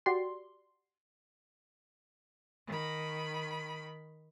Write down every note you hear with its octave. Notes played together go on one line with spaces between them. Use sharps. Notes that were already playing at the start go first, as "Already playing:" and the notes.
F#4 G4 D5 C6
D#3 B5